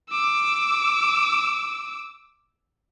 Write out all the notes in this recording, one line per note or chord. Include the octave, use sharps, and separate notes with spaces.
D6 E6